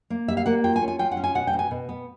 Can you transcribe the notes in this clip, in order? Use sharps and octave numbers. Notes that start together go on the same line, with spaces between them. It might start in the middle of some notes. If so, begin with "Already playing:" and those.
A#3
G3 E5
F5
A#3 F#5
F4 G5
G#5
C#4
G#5
F4 G5
F#5
C#4
G#5
B2 F#5
G5
B2
G#5
B2
B3